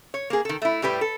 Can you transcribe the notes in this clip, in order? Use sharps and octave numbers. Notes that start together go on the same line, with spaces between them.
C#5
A#3 G#4
D#3 A4
A3 E4
A2 G3 G4 B4
A4